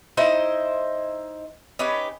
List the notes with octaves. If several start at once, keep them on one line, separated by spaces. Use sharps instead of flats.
D#4 E4 C5 D#5
C#4 D#4 G4 B4